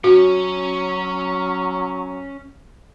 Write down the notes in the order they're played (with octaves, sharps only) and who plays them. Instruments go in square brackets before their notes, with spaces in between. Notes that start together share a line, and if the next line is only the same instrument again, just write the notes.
[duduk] F#3 [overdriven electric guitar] C#4 C#5 [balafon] F#4